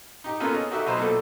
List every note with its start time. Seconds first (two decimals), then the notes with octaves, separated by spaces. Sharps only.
0.24 D#4 G4
0.40 A#3 B3 C#4 D#4 F4 A4
0.54 G#4 D#5
0.71 D#4 F#4 G4 A4 E5
0.86 B2 F#3 D#4 B4 C5
0.98 B1 A#2 A3 A4